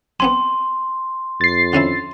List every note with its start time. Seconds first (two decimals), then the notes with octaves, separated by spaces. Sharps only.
0.20 B3 C4 G#5 C6
1.41 F2 A6 C7
1.73 D3 C#4 E4